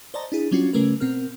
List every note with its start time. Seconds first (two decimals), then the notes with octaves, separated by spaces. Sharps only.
0.14 C5 D5 D#5 A5 A#5
0.32 D4 E4 G#4
0.51 F#3 G3 C#4 D4 F4 F#4
0.73 C#3 G3 A3 C#4 A#4 B4
1.00 B2 C4 A#4 F6